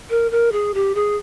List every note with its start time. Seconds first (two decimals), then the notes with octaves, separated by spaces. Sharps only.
0.10 A#4
0.31 A#4
0.52 G#4
0.74 G4
0.95 G#4